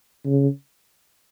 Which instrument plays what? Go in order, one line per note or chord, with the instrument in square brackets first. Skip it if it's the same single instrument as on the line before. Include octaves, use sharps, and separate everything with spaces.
[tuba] C#3